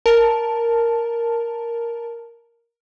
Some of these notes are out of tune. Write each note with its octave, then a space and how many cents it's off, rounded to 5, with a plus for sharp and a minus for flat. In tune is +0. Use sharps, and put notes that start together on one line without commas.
A#4 +0 A5 +0